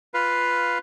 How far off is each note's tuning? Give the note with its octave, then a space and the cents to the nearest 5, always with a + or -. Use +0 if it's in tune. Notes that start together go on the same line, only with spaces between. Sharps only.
F4 +0 B4 +0 F5 +0